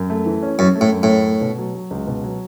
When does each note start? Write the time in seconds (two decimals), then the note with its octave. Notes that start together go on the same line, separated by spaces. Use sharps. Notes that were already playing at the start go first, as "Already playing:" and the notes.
Already playing: F#2
0.10 A3
0.26 E3
0.42 C#4
0.59 F#2 C#4
0.75 A3
0.81 A2
0.92 F#2
1.03 A2
1.09 C#4
1.25 A3
1.41 B2
1.58 F#3
1.74 F#3
1.91 C#2
2.07 B2
2.24 F#3